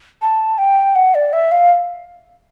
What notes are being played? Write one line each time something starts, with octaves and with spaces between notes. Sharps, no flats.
A5
G5
F#5
D5
E5
F5